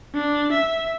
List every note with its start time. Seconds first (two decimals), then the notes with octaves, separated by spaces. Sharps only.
0.14 D4
0.52 E5